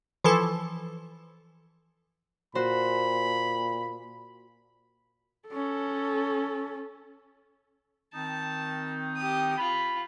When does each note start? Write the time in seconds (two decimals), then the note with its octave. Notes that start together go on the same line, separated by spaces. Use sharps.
0.24 E3 F3 A4
2.55 A#2 F#4 C5 B5
5.48 C#4 A4
8.14 D#3 C4 D#4 A5
9.16 G4 D#6
9.58 F4 B5